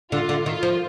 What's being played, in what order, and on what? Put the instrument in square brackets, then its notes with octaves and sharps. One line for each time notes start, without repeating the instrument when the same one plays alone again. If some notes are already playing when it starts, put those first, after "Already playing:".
[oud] D3 [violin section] F4
[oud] D3
[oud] D#3 [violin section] F4
[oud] F3